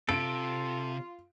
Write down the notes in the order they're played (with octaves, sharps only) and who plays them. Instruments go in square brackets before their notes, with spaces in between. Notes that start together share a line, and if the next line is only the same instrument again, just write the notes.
[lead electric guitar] C3 [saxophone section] F4 [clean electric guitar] A4 [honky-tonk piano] D7